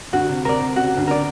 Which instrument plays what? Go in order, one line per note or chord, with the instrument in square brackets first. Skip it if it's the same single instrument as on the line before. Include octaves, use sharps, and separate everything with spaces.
[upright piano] D2 D3 [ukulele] F#4
[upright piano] C3
[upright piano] C3 [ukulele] A#4 D5
[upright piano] C3
[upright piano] C#3 [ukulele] F#4
[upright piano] D2 D3
[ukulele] A#4 D5